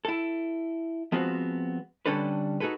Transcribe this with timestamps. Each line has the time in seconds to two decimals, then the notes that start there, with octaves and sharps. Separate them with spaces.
0.05 E4 A4
1.12 F3 G#3 B3 C4 F#4
2.06 D3 G3 C#4 D4 A4 B4
2.60 D#4 F#4 G#4 A4 B4